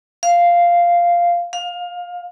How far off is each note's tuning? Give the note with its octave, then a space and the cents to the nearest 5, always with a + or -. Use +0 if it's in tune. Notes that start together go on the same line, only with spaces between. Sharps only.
F5 -5
F5 +20